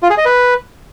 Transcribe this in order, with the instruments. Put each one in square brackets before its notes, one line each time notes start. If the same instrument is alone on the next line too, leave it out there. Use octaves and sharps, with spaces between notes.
[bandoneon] F4
G#4
D#5
B4